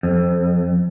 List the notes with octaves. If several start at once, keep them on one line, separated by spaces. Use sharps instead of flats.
F2